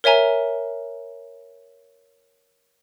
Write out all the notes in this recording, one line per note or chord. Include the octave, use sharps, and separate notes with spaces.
A#4 C#5 E5 G#5 A#5